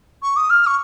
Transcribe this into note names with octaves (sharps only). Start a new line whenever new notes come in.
C#6
D#6
F6
C#6